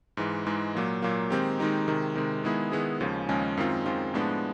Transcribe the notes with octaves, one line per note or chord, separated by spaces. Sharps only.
G#2 E3 G#3
G#2 E3 G#3
A#2 F#3 A#3
A#2 F#3 A#3
D#3 G#3 C4 D#4 G4
D#3 G#3 C4 D#4 G4
C3 D#3 G#3
C3 D#3 G#3
D#3 G#3 B3 E4 G#4
D#3 G#3 B3 E4 G#4
D#2 C#3 F3 G#3 C#4
D#2 C#3 F3 G#3 C#4
F#2 D#3 G#3 C4 F4
F#2 D#3 G#3 C4 F4
A2 F3 G#3 B3 D4